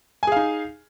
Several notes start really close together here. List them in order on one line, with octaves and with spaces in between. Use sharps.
G#5 G#4 F5 D#4